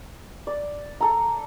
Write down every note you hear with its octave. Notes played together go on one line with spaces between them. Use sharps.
D5
A4 A#5